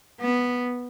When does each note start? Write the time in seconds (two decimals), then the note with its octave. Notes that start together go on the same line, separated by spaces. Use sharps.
0.21 B3